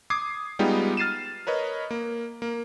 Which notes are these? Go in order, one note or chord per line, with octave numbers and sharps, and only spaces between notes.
D6 D#6 G#6 C7
G3 G#3 B3 D#4 F4 G4
F6 A6 C7 D#7 E7
A#4 B4 C#5 D#5
A#3
A#3